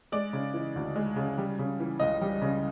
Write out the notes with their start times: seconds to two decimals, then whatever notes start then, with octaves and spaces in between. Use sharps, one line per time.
0.12 G#3 D5
0.33 C#3
0.54 E3
0.76 D2
0.96 G#3
1.16 C#3
1.38 G3
1.59 C#3
1.80 E3
2.00 C#2 D#5
2.21 G3
2.41 C#3